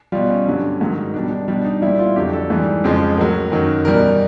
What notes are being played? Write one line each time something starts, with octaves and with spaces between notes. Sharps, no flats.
B2 G3 F4
C#4
G2 D3 F#3
G#2 D#3 F#3
B2 G3 D4
D4
B2 G3 D4
D#4
A#2 G3 E4
F4
F2 D3 F#3 G4
A4
G#2 E3 G3
F2 C#3 F3 G#3
A2 F#3 A#4
F#2 D#3 F#3
E2 B2 G3 A#4